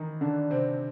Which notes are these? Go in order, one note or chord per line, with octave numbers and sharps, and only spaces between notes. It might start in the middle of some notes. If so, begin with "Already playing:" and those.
Already playing: D#3 E3 D#4
D3 D4
C3 C4